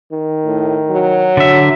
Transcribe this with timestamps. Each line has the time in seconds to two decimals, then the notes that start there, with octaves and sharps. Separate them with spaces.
0.12 D#3
0.45 A2
0.91 F#3
1.37 D3 E5